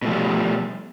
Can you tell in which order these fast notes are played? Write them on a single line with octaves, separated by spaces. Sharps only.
B2 A3 F3 G3